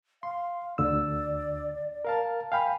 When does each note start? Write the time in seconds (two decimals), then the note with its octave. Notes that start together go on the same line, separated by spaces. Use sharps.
0.23 F5 C6
0.78 D2 D3 D5 E6
2.05 A#4 F5 A5
2.52 F5 G5 G#5 B5